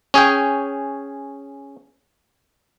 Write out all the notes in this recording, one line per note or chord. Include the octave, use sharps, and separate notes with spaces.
C#4 G#4 C#5 G5